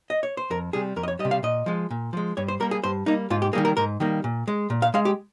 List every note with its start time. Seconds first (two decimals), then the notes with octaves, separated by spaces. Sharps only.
0.10 D#5
0.23 C#5
0.37 C5
0.50 F2 A#4
0.73 C3 G3 G#4
0.96 F2 A#4
1.03 D#5
1.08 C#5
1.19 G3 D#5
1.25 C3
1.31 F5
1.43 A#2 D#5
1.66 F3 G#3
1.90 A#2
2.13 F3 G#3
2.37 G2 C#5
2.48 C5
2.60 G3 A#3 A#4
2.71 G#4
2.83 G2 C5
3.06 G3 A#3 D#4
3.30 G#2 F4
3.42 G4
3.53 D#3 G3 A#3 G#4
3.65 A#4
3.77 G#2 A#4
4.00 D#3 G3 A#3
4.24 A#2
4.48 G#3
4.70 A#2
4.82 F5
4.94 G#3 F5
5.05 G4